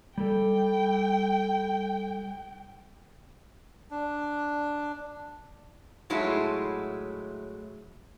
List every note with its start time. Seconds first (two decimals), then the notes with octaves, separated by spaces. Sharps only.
0.18 G3 A4 G5
3.91 D4
6.10 A2 F#3 G#3 E4 F4